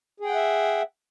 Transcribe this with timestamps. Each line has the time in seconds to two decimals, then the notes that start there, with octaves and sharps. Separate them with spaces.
0.20 G#4
0.25 G5
0.30 F#5
0.35 E5